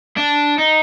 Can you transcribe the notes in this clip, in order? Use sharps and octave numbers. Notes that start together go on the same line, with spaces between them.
D4
D#4